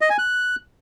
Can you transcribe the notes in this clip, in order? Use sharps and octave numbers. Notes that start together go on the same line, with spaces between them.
D#5
G#5
F#6